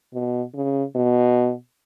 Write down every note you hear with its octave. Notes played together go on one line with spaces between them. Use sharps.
B2
C#3
B2